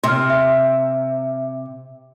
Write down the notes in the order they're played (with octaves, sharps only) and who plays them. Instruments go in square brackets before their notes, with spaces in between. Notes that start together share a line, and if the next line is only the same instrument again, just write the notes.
[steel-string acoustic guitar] C3 [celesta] C6 F6
[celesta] E5